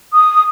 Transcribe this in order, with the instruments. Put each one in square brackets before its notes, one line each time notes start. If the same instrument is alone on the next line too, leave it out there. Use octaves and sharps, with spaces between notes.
[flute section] D#6